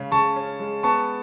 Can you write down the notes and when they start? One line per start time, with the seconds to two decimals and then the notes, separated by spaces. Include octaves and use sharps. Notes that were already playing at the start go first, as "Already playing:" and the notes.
Already playing: C#3 G#3 C#4
0.12 C#3 A5 C#6
0.36 C#4
0.59 G#3
0.83 B3 A5 C#6